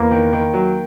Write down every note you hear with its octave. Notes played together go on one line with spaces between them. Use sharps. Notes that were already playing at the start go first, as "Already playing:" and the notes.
Already playing: E2 A#3
D#3
D#3
F#3